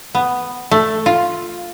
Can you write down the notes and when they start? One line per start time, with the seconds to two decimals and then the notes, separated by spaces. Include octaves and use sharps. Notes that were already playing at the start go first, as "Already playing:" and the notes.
0.15 B3
0.71 A3
1.06 F4